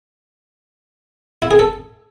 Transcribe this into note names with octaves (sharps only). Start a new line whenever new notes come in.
E4
G#4
A4